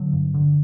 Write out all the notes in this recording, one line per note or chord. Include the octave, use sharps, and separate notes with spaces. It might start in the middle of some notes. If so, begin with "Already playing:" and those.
Already playing: D3 F#3
G2
D3